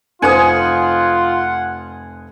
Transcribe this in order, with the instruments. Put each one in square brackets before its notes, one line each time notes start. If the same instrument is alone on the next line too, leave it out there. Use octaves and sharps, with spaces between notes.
[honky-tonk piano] F1 C5 D#6 [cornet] F4 [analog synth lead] F#5 [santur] G#5